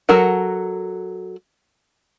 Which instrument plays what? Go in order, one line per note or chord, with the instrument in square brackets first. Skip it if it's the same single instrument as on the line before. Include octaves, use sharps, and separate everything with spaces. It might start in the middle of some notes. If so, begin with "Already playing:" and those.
[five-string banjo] F#3 A4 A#4 F#5